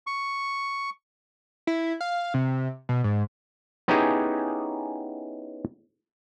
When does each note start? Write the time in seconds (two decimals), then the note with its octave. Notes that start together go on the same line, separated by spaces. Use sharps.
0.07 C#6
1.67 E4
2.01 F5
2.34 C3
2.89 B2
3.04 G#2
3.88 B3 C#4 D#4 E4 G4 G#4